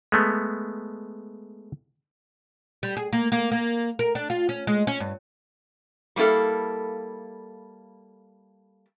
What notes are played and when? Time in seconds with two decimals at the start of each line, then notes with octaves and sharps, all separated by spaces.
0.12 G#3 A3 B3
2.83 G3
2.97 G#4
3.13 A#3
3.32 A#3
3.52 A#3
3.99 A#4
4.15 D4
4.30 F4
4.49 C#4
4.67 G#3
4.87 C#4
5.00 G2
6.16 G3 A#3 E4 A4 F5